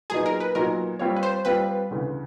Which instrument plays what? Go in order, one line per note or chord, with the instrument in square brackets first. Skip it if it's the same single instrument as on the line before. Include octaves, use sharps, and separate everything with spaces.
[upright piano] A#2 F#3 B3 D#4 [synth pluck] G#4
[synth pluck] A#4
B4
[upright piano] A#2 F#3 B3 D#4 [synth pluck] A#4
[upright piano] G3 C4 F4 [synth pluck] C#5
[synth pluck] B4
C5
[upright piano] G3 C4 F4 [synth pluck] B4
[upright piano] D2 C#3 E3